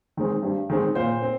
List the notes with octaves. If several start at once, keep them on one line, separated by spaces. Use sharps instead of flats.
D#3 G#3 C4
G2
D#3 G#3 C4
A#2 C5
C4